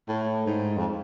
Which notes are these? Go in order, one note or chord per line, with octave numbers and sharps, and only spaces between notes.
A2
G#2
F2